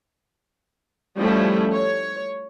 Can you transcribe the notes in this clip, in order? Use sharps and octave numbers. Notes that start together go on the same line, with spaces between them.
F3 G3 A3 C#4 E4
C#5